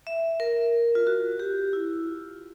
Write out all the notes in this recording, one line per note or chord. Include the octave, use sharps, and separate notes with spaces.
E5
A#4
F4
F#4
G4
E4
F4